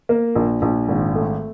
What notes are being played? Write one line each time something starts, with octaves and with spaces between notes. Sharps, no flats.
A#3
A#1
A#1
G#1
A3